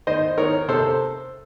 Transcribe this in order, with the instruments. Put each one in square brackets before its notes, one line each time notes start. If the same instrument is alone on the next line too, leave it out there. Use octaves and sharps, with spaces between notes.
[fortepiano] D#3 C5 D#5
D#3 A#4 C#5
C3 A4 C5